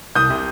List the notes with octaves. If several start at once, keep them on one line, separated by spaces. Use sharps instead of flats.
C2 D#6 G6
C3